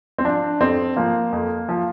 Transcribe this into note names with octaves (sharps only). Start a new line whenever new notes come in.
C4
F3 D4
F2 C4
F3 A#3
F2
F3